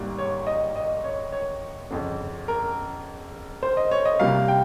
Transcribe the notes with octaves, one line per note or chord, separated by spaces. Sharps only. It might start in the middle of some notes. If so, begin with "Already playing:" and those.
Already playing: G#1 G#2 G3 A#3
C#5
D#5
D#5
C#5
C#5
G1 F2 C#3
A#4
C5
D#5
C#5
D#5
C2 C3 G3 A#3 F5
G5